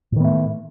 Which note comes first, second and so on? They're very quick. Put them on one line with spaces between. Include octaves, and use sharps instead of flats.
A2 D#3 B3 A3